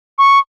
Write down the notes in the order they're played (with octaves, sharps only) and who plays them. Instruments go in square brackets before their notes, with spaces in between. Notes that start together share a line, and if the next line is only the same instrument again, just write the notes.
[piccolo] C#6